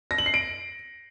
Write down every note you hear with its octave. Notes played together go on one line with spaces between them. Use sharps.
A#6
F#7
C7
D7